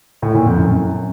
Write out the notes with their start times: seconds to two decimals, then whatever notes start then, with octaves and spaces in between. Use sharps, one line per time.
0.22 A2
0.34 A#2
0.46 F2
0.58 F#2